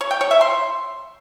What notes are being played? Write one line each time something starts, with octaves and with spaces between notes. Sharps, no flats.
C#5
G5
C#5
E5
C6